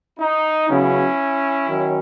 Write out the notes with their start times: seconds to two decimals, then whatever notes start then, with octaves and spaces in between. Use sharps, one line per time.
0.19 D#4
0.69 C#3 F#3 B3 C#4 E4
1.69 D#3 F#3 C#4